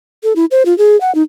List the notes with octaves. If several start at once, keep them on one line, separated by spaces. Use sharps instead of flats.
A4
E4
C5
F4
G#4
F#5
D#4